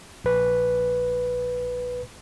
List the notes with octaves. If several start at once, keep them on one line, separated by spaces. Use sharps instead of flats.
A#1 B4